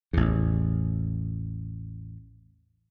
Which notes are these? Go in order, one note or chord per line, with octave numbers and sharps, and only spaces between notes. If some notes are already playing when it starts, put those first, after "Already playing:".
A1 E2